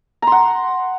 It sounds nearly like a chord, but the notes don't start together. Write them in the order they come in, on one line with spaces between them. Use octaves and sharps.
A#5 C6 F#5